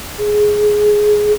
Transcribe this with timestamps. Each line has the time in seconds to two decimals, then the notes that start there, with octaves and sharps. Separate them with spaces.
0.18 G#4